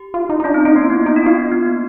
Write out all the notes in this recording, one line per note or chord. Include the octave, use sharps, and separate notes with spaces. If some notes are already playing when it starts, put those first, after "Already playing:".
Already playing: G4
F4
D#4
D#4
C#4 D4
C4 D#4
C#4 D#4
A#3 C#4
E4
B3
F4
C#4 D#4
D4 E4
B3 F4
B3
A#3